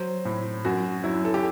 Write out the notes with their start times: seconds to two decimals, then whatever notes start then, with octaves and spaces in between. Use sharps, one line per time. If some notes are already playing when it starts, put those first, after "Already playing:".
Already playing: F#3 C5
0.25 A2
0.65 F#2 F#4
1.04 F#3 E4
1.25 A4
1.34 G4